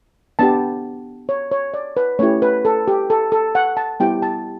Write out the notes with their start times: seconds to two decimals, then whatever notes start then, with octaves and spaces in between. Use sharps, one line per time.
0.39 B3 D4 G4 A5
1.29 C#5
1.51 C#5
1.74 D5
1.97 B4
2.19 A3 C#4 E4 G4 C#5
2.42 B4
2.65 A4
2.88 G4
3.10 A4
3.32 A4
3.55 F#5
3.77 A5
4.00 G3 B3 E4 G4 G5
4.22 A5